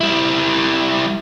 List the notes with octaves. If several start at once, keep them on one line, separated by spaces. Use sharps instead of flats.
G3 E4